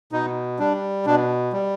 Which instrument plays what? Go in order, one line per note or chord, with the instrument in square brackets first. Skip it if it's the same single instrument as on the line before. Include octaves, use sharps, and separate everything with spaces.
[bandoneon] B2 D#4
G3 D4
B2 D4
G3